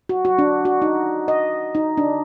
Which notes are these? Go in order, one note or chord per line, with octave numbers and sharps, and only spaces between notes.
F#4
F#4
D4
F#4
D#4
D#5
D#4
D4